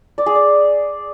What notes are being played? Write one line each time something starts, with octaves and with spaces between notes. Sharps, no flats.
D5
G#4
D5